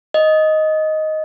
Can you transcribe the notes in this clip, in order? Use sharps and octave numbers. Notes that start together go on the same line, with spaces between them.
D#5